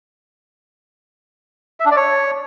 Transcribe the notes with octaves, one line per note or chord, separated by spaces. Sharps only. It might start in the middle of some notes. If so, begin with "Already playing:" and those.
E5
D4
D5
C#5